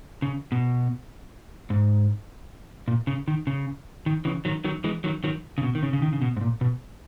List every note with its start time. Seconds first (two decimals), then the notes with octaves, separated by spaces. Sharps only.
0.22 C#3
0.52 B2
1.70 G#2
2.88 A#2
3.07 C#3
3.28 D#3
3.47 C#3
4.06 D#3
4.25 C#3 E3
4.45 D#3 F#3
4.64 D#3 F#3
4.84 E3 G#3
5.04 D#3 F#3
5.24 D#3 F#3
5.58 C#3
5.63 B2
5.75 D#3
5.83 C#3
5.93 C#3
6.02 D#3
6.13 C#3
6.22 B2
6.37 G#2
6.41 A#2
6.61 B2